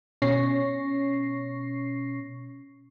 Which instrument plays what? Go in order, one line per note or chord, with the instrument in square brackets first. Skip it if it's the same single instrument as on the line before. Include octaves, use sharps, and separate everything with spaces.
[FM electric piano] B2 C#4 C#6 A#6 C7